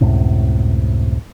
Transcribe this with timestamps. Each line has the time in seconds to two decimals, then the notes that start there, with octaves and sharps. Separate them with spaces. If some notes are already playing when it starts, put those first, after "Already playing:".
0.01 C#2 F#2 A2 C3